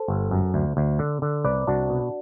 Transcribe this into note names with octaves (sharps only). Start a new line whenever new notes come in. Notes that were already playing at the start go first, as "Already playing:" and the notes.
Already playing: A4 C5
G1
F#2
D2
D2
D3
D3
C2 B4 D5
C2 D4 F#4
B2